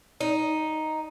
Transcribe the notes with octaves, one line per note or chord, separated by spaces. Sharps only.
D#4